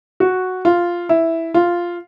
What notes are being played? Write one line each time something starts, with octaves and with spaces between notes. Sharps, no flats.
F#4
F4
E4
F4